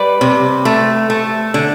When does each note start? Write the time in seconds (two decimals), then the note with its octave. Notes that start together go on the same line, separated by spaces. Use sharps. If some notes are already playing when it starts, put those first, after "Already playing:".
Already playing: G3 B4 D5
0.21 C3
0.65 A3
1.10 A3
1.54 D3